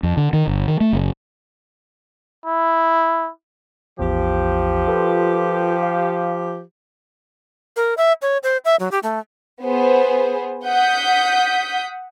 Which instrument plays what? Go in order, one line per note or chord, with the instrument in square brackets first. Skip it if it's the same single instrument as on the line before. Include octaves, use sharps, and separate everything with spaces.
[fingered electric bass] F2
D3
D#3
G1
D#3
A3
F#1
[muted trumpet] E4
[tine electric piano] A1 E2 [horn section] F3 G4
[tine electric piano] F4 A4 B4
F5
[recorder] A#4
E5
C#5
C5
E5
F#3
G4
A3
[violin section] B3 G#4 C5
F#5 D#6 G6 B6